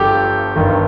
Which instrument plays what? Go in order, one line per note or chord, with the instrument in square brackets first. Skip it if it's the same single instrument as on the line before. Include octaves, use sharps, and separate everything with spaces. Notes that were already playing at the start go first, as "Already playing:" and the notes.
Already playing: [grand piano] G1 G2 F3 G4 A4
G1 G2 D#3